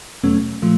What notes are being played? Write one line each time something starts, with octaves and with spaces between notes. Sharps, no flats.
E2 B2 F#3 A3 C#4
A#2 F3 A3